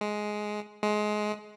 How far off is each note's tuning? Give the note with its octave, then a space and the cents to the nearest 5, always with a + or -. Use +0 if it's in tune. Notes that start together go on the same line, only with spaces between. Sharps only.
G#3 +10
G#3 +20